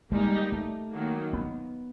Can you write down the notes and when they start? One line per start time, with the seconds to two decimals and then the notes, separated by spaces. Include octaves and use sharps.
0.12 G3 G#3 A#3 D#4 G4
0.52 A3
0.92 D#3 F#3 A#3
1.33 B3